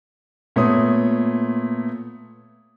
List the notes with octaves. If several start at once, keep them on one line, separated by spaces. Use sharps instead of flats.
A#2 A3 B3 C#5 D#6